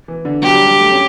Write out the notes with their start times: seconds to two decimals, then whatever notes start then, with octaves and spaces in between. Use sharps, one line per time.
0.08 E3
0.25 D3
0.42 F#3 G4
0.54 G3
0.66 G3
0.80 A3
0.92 C#4